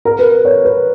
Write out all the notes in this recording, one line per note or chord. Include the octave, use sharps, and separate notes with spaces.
A#4
B4
C#5
B4